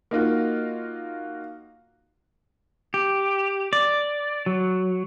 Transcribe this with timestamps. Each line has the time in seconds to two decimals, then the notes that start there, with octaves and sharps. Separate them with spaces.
0.11 A#3 D#4 F4 F#4
2.94 G4
3.73 D5
4.46 F#3